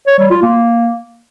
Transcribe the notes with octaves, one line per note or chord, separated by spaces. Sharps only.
C#5
G3
F4
A#3